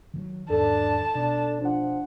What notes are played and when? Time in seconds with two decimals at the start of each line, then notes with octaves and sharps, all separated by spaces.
0.14 D#3 E3 F#3
0.50 E2 G#2 D#3 D4 A4 A5
1.15 B2 D4
1.61 F3 D4 F#5